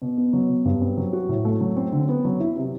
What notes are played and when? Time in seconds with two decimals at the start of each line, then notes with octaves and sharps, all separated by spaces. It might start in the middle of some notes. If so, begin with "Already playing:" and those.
0.02 B2
0.17 B3
0.33 F#3
0.49 B2
0.65 G2
0.81 C4
0.97 F#3
1.13 F#4
1.29 A2
1.45 A3
1.61 F#3
1.77 C4
1.92 D3
2.09 B3
2.25 F#3
2.40 E4
2.56 C3